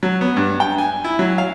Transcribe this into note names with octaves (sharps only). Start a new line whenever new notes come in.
F#3
B3
G2
G5
G#5
E4
F#3
F5